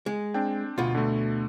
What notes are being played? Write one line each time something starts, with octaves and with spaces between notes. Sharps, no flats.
G#3
C4 D4 G5
D2 B2 F4
D3 A3